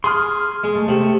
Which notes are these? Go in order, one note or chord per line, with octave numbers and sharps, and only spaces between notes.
G#4 C6 F6
G#3
A3
C3